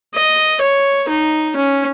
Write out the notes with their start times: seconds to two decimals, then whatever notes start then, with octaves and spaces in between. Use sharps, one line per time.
0.15 D#5
0.61 C#5
1.09 D#4
1.56 C#4